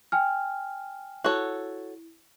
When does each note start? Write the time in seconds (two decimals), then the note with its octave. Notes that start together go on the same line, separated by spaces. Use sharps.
0.12 G5 G#5 F6
1.24 E4 F#4 A4 C#5